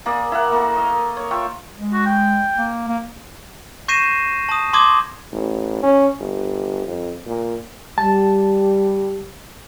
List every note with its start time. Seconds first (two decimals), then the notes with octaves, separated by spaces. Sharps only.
0.06 A#3 G#4 D5
0.32 E4 A#4 F#5
0.52 A#3 F#4 A4
0.76 D#5 F5
1.17 C#5
1.31 F4 E5 G5 C#6
1.76 G#3
1.93 F#4
2.06 G5
2.58 A#3
2.88 A#3
3.88 C#6 G6 A#6 C7 D#7 E7
4.49 A5 D#6
4.73 A5 C6 D6 D#6 G#6
5.32 A1
5.83 C#4
6.20 G1
6.87 F2
7.26 A#2
7.98 G3 A5